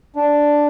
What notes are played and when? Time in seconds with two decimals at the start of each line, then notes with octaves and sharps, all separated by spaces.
0.16 D4